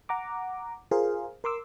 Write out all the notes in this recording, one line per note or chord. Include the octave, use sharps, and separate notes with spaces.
F#5 A#5 D6
F4 G#4 A#4 C5 F5
A#4 C6 D6 E6